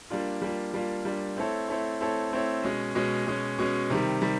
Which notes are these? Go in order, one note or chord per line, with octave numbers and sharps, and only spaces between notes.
G3 A#3 D4 F4
G3 A#3 D4 F4
G3 A#3 D4 F4
G3 A#3 D4 F4
A3 C4 E4 A4 C#5
A3 C4 E4 A4 C#5
A3 C4 E4 A4 C#5
A3 C4 E4 A4 C#5
B2 G#3 C#4
B2 G#3 C#4
B2 G#3 C#4
B2 G#3 C#4
C3 D#3 G3
C3 D#3 G3